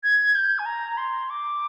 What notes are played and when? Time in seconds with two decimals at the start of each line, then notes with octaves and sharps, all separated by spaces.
0.04 G#6
0.35 G6
0.59 G#5
0.66 A#5
0.97 C6
1.30 D6